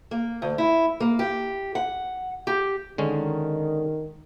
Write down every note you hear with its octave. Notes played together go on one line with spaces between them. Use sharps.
A#3
D2
E4
A#3
G4
F#5
G4
D3 D#3 G#3 C#4